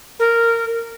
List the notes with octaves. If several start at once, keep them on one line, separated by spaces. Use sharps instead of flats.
A#4